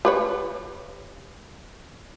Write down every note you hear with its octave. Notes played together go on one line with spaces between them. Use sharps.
G4 B4 C#5